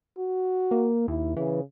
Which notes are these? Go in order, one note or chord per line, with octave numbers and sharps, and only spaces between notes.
F#4
A#3
D#2 E4
C#3 E3